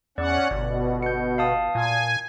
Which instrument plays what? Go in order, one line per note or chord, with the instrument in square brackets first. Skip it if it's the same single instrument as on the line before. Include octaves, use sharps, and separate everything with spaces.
[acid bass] E2 [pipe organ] C#4 F#5 [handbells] D5
[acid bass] G1 [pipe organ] B2
[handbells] G6 C#7
F5 A5 D#6
[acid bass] A#2 [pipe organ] G#5